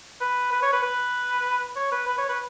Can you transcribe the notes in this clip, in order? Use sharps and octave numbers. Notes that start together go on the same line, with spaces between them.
B4
B4
C#5
B4
B4
C#5
B4
B4
C#5
B4